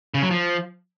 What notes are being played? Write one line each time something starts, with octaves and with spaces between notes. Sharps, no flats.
C#3
F#3
F3